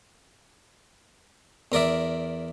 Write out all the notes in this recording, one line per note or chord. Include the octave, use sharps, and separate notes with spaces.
E2 A#4 D5 E5